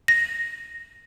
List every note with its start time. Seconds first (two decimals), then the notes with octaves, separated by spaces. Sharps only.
0.08 A#6